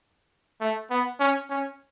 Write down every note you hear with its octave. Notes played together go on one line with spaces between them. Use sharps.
A3
B3
C#4
C#4